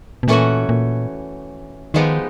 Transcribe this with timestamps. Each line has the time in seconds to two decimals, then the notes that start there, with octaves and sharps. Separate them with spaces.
0.23 B2
0.28 A#2 E3 A3 C#4 F#4
0.69 A#2
1.94 D#3 F3 G#3 B3 D#4 G4